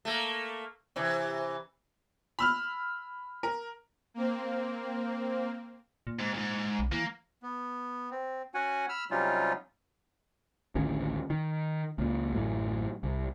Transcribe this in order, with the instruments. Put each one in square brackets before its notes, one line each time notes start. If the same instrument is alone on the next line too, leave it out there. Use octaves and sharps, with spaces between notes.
[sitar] A3 A#3
C3 E3
[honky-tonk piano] B5 E6 F6
A#4
[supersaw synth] A#3 C4
[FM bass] A#2
[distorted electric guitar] G#2
F2 G#2
[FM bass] B1
[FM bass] E3 [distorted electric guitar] A#3
[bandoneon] B3
C4
C#4 F#4 F#5 G#5
B5 E6 F6
C3 F#3 G3 C#4 D#4 F4
[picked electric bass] A1 D2 D#3 C#4
D#3
C#2 A#2
A1 F#2 A2 E3
C2